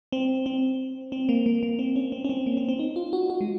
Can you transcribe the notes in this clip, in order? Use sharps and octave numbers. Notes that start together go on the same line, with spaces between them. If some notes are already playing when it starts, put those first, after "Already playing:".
C4
C4
C4
A#3
A#3
A#3
C4
C#4
C4
C#4
C4
A#3
C4
C4
D#4
F4
F#4
F#4
G#3